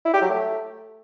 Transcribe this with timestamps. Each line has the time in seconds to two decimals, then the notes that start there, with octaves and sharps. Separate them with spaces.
0.05 E4
0.13 G4
0.21 F#3
0.29 A3